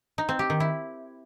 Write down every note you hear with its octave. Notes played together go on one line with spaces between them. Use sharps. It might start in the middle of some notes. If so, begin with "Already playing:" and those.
D#4
C4
G4
D#3
E4